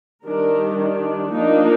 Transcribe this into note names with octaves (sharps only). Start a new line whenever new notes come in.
D#3 G3 D4 A#4
D4
F3 A#3 D4 D#4